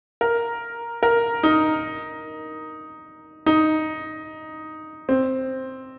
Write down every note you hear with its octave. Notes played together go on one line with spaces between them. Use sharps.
A#4
A#4
D#4
D#4
C4